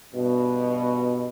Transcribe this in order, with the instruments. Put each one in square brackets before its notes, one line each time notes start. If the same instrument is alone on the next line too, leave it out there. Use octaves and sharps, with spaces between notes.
[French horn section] G2 B2